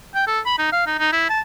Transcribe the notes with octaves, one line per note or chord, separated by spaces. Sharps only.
G5
A4
B5
D#4
F5
D#4
D#4
E4
A5